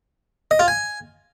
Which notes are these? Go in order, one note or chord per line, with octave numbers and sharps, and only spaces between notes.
D#5
F4
G#5